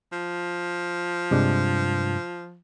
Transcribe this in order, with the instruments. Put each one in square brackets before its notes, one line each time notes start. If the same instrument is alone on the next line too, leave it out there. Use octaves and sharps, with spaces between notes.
[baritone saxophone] F3
[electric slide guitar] G2 [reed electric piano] C3 G#3 D4